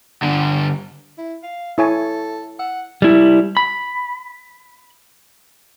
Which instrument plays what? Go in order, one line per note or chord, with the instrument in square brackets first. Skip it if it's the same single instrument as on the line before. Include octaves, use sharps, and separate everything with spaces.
[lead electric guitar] G2 D3
[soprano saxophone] E4
F5
[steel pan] E4 C#5 G#5 [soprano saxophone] A4
[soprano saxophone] F#5 [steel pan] E6
[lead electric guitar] G3 E4
B5